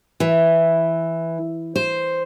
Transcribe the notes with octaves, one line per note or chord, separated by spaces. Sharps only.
E3
C5